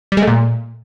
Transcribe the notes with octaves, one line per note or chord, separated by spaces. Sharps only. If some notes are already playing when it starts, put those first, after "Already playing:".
G3
G#3
A3
A#2